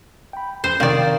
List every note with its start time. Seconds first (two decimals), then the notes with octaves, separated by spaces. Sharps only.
0.33 G5 B5
0.64 F2 C5
0.80 C3 D#3 D5 F5 G5